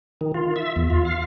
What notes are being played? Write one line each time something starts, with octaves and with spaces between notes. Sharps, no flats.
D#3
F4
E5
E2
F4
F5